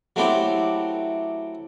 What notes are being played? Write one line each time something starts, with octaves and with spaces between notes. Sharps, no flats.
F#3 A3 C4 E4 G4